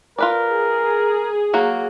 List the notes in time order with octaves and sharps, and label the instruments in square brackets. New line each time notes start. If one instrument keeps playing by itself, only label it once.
[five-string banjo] F4 B4 D5 [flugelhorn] A#4
[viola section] G#4
[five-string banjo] F#3 A#3 F#4